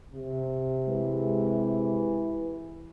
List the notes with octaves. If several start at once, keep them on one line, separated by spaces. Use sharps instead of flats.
C3
E3 G#3